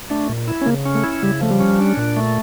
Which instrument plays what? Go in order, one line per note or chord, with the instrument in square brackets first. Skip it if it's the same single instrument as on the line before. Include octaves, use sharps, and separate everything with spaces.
[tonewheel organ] A3 [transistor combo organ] D4
[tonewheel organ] A#2
E4
[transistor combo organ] C#4
[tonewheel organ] C#3 [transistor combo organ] A#3
[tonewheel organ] C#4
[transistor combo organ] A3
[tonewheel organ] E4
[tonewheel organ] C#3 [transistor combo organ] G3
[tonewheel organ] F3 [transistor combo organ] A3
[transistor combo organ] G3
[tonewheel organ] C#4
D4
A#2
A3